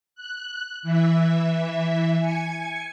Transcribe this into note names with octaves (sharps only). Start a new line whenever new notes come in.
F#6
E3 E5
G#5 G#6 C#7